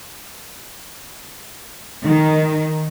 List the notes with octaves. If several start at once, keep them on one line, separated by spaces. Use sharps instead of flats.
D#3